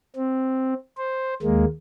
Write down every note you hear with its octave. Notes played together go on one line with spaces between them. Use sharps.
C4
C5
D#2 G#3 A#3